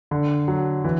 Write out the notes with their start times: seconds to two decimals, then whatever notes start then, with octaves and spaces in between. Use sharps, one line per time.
0.11 D3
0.48 F#3
0.84 E3